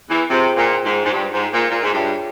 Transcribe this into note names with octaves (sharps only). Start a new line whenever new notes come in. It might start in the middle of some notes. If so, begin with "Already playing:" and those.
E2 E3
C3 F4 G#4 C5 G5 C6
A#2
G#2
G#2
G2
G#2
A#2
A#2
G#2
G2 F4 G#4 C#5 E5 G5